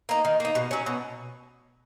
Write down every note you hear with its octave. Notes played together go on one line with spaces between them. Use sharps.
A#3 D#4
D#3
A#3 D#4
B2
F#3 C#4
B2